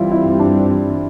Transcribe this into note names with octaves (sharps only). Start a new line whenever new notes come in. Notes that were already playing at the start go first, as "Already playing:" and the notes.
Already playing: G2 E3 G3 C4 E4 F4
E4
D4